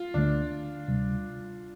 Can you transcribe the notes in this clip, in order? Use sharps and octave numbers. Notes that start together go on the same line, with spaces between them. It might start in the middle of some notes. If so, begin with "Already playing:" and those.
Already playing: F4
D2 D3 A3 D4
D2 C3 G3